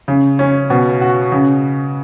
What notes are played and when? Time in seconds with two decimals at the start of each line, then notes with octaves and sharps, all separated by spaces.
0.08 C#3
0.39 C#4
0.70 B2
1.01 F#4
1.32 C#3